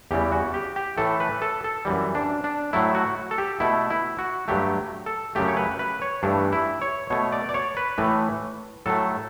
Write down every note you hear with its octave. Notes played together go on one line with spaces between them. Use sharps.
E2 C#3 E3 G3 G4
F#4
G4
G4
A2 E3 A3 A4
B4
A4
A4
F#2 E3 G3
D4
D4
A2 F#3 A3 E4
F#4
A4
G4
B2 A3 E4
E4
F#4
G2 F#3 A3 G4
A4
F#2 C#3 F#3 A3 G4
C#5
B4
B4
C#5
G2 E3 A3 D4
E4
C#5
B2 A3 C#5
D5
D5
C#5
B4
A2 E3 A3
A2 F#3 A3 A4